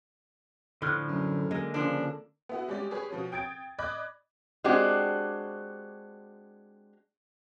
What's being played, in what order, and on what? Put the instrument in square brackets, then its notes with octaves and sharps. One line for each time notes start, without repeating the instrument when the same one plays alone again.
[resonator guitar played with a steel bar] A2 F3 [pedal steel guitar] D3 F6 F#6
[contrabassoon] F#2
[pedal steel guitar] D3 A#3 A#4 [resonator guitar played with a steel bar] G#3
[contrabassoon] C#3 [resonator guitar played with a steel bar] F3 D4
[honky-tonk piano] B3 E4 F#4
G3 G#3 C#4 G4 D5
G4 G#4 B4 C#5
B2 F3 C#4
G5 D#6 G#6 A6 D7
D5 D#5 B5 D6 F#6 G#6
[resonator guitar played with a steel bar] G#3 C4 D4 F#4 G4